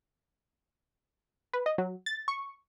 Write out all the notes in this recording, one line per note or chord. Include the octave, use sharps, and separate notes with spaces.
B4
D#5
F#3
A6
C#6